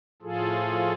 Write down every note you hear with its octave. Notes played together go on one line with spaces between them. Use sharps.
A2 F3 F4 G#4 A4